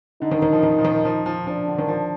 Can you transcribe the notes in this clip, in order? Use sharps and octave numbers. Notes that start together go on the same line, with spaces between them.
D3 D#4
D#3
D#3
F3
D#3
F3
D#3
F3
F3
F3 D4
D3
D#3
F3